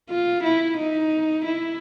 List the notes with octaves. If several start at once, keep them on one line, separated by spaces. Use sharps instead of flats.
F4
E4
D#4
E4